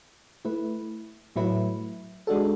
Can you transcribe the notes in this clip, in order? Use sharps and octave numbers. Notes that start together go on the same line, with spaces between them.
A3 E4 B4
A2 F#3 A3 E4 B4
G#3 D4 F#4 A4